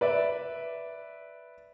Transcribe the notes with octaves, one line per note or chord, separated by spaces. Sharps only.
B4 D5 E5